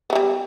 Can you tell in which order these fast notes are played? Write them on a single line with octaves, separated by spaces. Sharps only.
B3 G#3 G3